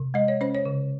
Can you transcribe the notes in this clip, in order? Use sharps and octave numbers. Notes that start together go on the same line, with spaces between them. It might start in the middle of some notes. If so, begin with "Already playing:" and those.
Already playing: C3
G#3 D#5
C#5
C#4 C5
C#5
C#3